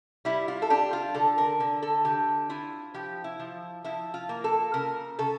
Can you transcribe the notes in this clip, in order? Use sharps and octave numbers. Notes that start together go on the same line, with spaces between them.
G3 E4
F4
A4
D4 G4
F4
D3 A4
A#4
D3
A4
D3 G4
E4 F4
F3 G4
E4
F3
F3 E4
F4
A#3
A4
C#3 A#4
C#3 A4